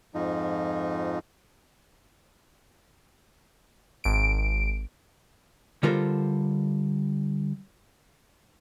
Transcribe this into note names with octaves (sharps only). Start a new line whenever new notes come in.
F2 G#2 F3 D#4
G#1 D7
D3 G3 F4 A4 A#4 C5